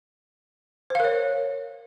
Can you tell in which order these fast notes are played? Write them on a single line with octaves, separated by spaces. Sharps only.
C5 F5 A#4 C#5